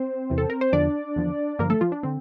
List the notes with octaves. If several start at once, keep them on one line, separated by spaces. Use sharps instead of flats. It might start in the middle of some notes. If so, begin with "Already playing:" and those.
Already playing: C4 C5
E2 C3 E3
A4
A#4
C5
E2 D3 F3 D4 D5
E2 D3 F3
G2 D3 F3 A#3 A#4
A3 A4
F3 F4
D4
D3 C4